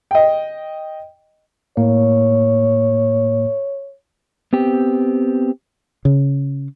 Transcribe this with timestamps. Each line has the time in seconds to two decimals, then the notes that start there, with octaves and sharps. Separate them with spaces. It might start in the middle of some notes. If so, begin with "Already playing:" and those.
0.11 D#5 G5
1.77 A2 A#3 C#5
4.53 B3 C4 G4
6.05 C#3